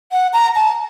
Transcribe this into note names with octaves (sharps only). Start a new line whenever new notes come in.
F#5
A#5
A5